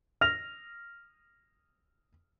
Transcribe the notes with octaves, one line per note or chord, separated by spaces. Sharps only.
F6 A#6 F7